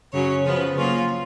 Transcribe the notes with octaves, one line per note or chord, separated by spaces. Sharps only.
F#2 C#3 F#3 C#4 C#5
C#3 F3 B3 B4
C#3 F#3 A#3 C#4 F4